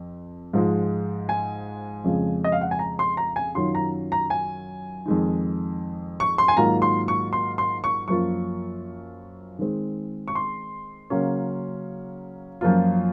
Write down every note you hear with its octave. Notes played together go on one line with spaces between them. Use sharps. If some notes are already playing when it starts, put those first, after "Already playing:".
Already playing: F2
G#2 F3 G#3
G#5
F2 C#3 F3 G#3
D#5
F5
F#5
G#5
A#5
C6
A#5
G#5
F#2 D#3 F#3 C#4 F4 C6
A#5
A#5
G#5
F2 D#3 G#3 D#4
C#6
C6
G#5
G#2 D#3 F#3 A#3 F4 A#5
C6
C#6
C6
C6
C#6
F#2 F3 A#3 F4 C#6
D#3 G#3 C4
C#6
C6
C#3 F#3 A#3 C#4
F#2 F3 A#3 F4